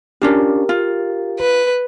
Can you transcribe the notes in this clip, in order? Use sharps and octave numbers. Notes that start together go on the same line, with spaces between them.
C#4 D4 F4 G4 A#4
F4
B4